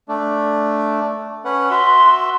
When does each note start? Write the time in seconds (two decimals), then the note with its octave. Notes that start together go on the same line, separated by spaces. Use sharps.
0.09 A3 D4
1.45 C#4 B4 F#5
1.71 F#4 E5 C6